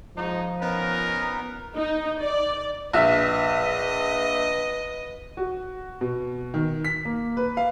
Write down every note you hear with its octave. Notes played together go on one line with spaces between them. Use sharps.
G#2 F3 D#4
B3 C#4 D#4 A#4
D#4
D5
A#1 B4 D#5 E5
F#4
B2
D#3
B6
A#3
B4
F5